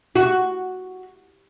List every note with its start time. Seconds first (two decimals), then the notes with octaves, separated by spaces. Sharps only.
0.16 F#4